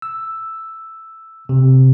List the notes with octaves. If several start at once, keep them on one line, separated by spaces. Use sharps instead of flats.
E6
C3